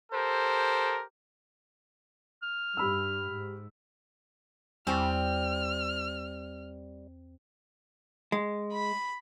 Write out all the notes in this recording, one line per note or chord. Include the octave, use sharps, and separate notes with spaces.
G4 A4 A#4 C5
F6
G2 G4 B5 E6
G#2
E2 G3 C4 C#6 F6
G#3
B5